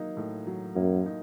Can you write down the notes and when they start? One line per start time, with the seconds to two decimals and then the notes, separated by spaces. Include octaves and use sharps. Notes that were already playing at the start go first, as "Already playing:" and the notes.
Already playing: F#3 A#3 D#4
0.17 A2
0.47 F#3
0.76 F#2 A#3
1.06 D#4